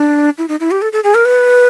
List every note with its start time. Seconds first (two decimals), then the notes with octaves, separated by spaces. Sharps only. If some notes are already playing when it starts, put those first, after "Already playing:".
Already playing: D4
0.38 E4
0.48 D#4
0.60 E4
0.71 G4
0.82 A4
0.93 A4
1.04 G#4
1.15 A#4
1.25 B4